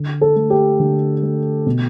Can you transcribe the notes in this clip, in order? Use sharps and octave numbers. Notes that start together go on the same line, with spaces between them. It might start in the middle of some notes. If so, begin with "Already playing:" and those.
Already playing: D3
A4
A3
G4
D3
A3
B2